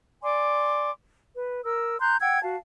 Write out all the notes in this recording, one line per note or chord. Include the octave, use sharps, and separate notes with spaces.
D5 G#5 C6 D6
B4
A#4 E6
A#5 C6 F#6 G6
F#5 G5 E6 G#6
F#4 F5 A5